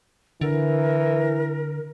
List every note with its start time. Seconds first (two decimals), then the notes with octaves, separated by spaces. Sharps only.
0.41 D3 E3 A#4